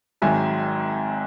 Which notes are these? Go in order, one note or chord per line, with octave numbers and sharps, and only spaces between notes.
G#1 G#2 D#3 F#3 E5 G#5